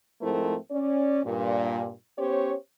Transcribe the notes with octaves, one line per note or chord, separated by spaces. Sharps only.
G#2 F3 A3 C4 E4 A#4
C#4 D5
G2 A#2
B3 C#4 G4 C5 C#5